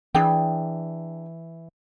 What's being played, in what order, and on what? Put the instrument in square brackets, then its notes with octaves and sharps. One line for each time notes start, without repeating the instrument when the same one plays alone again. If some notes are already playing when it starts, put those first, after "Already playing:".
[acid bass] E3 [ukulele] D4 G#4 G5